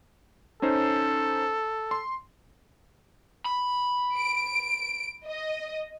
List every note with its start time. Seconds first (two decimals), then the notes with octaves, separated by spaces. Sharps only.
0.62 C#4 D#4 A4 C5
1.91 C6
3.45 B5
4.16 D7
5.26 D#5